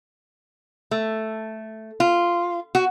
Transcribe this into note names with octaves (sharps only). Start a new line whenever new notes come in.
A3
F4
F#4